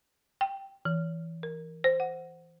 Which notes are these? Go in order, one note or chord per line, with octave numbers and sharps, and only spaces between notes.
G5
E3
A#4
C5
F#5